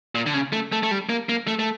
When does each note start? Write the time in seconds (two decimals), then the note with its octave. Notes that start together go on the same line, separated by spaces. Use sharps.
0.15 A#2
0.26 D3
0.34 C#3
0.53 A3
0.72 A3
0.83 A3
0.91 G3
1.09 A#3
1.29 A#3
1.47 A3
1.59 A3